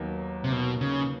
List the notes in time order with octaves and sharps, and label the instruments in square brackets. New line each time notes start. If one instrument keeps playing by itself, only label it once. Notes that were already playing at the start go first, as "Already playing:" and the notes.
Already playing: [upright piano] D#2 D#3 F#3 B3
[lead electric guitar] C3
B2
C#3